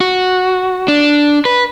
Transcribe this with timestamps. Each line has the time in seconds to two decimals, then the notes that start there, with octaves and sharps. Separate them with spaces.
0.01 F#4
0.88 D4
1.45 B4